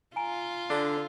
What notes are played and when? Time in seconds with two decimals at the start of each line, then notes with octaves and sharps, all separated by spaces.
0.16 F4 G#5 A#5 D7
0.70 D3 D4